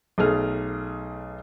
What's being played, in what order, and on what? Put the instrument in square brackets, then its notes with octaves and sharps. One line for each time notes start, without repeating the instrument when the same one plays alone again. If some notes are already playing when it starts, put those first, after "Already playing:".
[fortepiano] B1 A3 G#4 F6